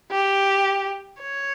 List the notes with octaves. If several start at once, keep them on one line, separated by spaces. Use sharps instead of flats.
G4
C#5